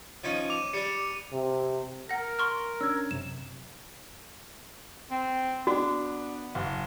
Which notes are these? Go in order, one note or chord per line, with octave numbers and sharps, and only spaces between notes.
F3 C#4 D#4
D6 D#7 F7
G3 D4 C#7
C3
A#4 F#5 A#6
C6 C#6 F6
C#4 D4 E6 G#6
F#2 C3 E7
C4
B3 D4 F#4
F#1